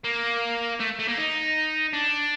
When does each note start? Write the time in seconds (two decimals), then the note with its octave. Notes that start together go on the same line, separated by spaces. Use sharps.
0.04 A#3
0.80 A3
0.99 A3
1.08 A#3
1.18 D#4
1.93 D4